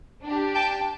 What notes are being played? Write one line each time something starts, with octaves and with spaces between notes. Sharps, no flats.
D4 G4
G5 A5